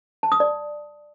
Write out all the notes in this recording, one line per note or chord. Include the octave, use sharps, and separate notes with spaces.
A5
D#6
D5